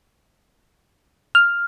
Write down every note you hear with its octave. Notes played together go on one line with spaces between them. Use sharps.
F6